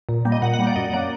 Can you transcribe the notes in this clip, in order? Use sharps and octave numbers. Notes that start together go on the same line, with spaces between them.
A#2
G3 A#3
D#5
A#2 F#5
F#5
G3 A#3
D5
F#2 D#5
F#3 A#3 D5